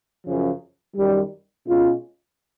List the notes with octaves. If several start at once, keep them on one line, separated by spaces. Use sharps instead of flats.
F#2 C#3 F3
F#2 D#3 G3
B2 G#3 C#4 F4